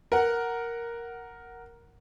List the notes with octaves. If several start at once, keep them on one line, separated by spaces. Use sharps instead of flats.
A#4 F#5